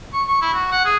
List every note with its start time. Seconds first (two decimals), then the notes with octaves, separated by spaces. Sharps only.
0.13 C#6
0.28 C#6
0.41 E4
0.54 F#4
0.71 F#5
0.85 G#4